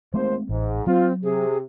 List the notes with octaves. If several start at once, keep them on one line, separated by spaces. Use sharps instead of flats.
D#2 G#3 A3 C4 C5
A1 G#2
F#3 C4 F4
C3 G#4